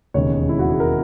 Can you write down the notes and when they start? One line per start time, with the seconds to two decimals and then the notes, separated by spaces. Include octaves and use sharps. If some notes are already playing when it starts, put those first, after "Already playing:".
0.14 E1 D#2 C#3 G#3 C#5
0.49 E4
0.59 F#4
0.69 G#4
0.80 A#4